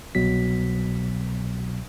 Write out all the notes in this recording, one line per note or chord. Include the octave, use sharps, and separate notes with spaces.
C2 B2 F#3 B6